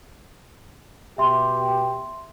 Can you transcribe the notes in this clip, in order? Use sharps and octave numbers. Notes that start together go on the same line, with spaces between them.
B2 G4 E5 C6